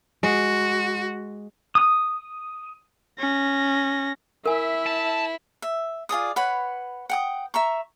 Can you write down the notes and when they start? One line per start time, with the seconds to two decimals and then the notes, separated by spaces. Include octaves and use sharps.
0.23 G#3 F#4
1.75 D#6
3.19 C#4 A#6
4.46 E4 A#4 E5 G#5
4.87 A5
5.62 E5
6.09 F4 G#4 D5 D#6
6.36 B4 C#5 F#5 B5
7.10 F#5 G5 D#6
7.54 E5 A#5 C#6